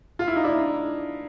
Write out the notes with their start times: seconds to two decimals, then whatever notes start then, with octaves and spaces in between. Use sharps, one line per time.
0.19 F4
0.28 E4
0.36 D#4
0.44 D4 E4